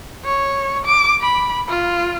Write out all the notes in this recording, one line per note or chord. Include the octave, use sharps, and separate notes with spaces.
C#5
D6
B5
F4